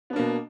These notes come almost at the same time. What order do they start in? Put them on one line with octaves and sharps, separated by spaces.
B3 D4 A#3 B2